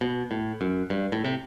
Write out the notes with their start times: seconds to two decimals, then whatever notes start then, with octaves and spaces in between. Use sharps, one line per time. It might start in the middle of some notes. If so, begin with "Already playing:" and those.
0.01 B2
0.31 A2
0.61 F#2
0.90 G2
1.12 A2
1.24 C3